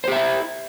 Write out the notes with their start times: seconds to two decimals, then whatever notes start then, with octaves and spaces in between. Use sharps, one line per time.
0.04 C5
0.08 G4
0.12 E5
0.16 E4